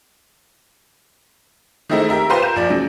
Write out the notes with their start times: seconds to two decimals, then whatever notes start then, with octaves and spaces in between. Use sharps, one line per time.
1.89 D#3 G#3 A3 C4 D#4 E4
2.09 G4 A#4 E5 A#5
2.29 F4 B4 C5 F5 G5 C6
2.42 A#4 G6 E7
2.56 A#1 F3 D5
2.70 C#3 F#3